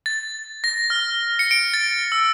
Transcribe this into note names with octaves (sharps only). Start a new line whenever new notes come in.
A6
A#6
F6
C#7
D7
A6
E6